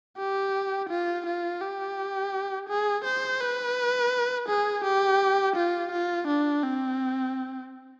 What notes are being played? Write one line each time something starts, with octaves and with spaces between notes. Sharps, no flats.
G4
F4
F4
G4
G#4
C5
B4
G#4
G4
F4
F4
D4
C4